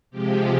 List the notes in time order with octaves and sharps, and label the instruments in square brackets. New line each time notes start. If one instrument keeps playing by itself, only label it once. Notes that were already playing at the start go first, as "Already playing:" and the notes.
[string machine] C3 F3 G#3 G4